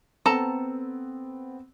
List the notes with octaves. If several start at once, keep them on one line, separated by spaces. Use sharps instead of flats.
B3 C4 A4 A5 A#5